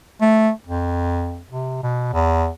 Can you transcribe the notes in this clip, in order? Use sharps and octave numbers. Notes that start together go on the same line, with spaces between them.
A3
F2
C3
B2
E2